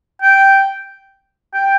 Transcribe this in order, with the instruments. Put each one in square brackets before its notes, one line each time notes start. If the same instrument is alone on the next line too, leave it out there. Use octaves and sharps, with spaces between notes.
[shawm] G5
G5